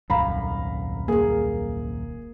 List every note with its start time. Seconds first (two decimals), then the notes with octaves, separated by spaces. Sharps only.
0.10 D#1 C2 F#2 F5 A#5 B5
1.08 A#3 G#4 A#4